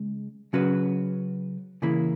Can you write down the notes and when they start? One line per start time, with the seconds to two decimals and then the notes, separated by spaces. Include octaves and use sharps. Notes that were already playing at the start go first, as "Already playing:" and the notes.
Already playing: C#3 G#3
0.53 C#3 F#3 C#4 F#4 B4
1.82 C#3 E3 A#3 E4